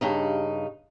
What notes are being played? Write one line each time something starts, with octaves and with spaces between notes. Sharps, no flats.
G2 C#3 D#4